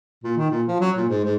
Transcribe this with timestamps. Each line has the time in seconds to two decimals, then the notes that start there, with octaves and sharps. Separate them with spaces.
0.24 A#2
0.37 D#3
0.50 A#2
0.68 F3
0.80 F#3
0.97 A#2
1.09 G#2
1.24 G#2